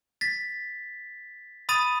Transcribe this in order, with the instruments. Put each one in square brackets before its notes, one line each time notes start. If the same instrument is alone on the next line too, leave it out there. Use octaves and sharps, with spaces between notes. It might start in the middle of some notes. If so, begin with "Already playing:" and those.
[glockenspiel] A6 B6
B5 D#6 A6 D#7